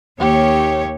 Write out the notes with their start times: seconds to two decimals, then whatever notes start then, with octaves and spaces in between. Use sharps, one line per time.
0.20 D#2 G4 C#5